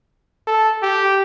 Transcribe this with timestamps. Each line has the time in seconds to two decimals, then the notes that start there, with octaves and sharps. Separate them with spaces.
0.47 A4
0.82 G4